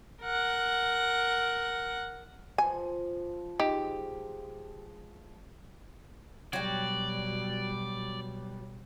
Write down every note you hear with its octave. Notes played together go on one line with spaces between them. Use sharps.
A#4 F#5
F3 G#5
G#3 D#4 G4
B2 F#3 G3 D5 G5